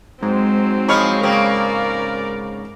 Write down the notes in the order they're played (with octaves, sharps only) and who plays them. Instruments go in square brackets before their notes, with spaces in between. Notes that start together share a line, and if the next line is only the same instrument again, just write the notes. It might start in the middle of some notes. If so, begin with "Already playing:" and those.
[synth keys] G#2 [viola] F#3 C4
[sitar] F3 G#3 C#5 [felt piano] B5 F6
[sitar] C#3 A#3 C4 [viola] A#4 D5